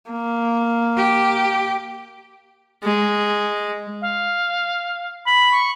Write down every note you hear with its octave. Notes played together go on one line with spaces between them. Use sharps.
A#3
G4
G#3
F5
B5 F#7
C#6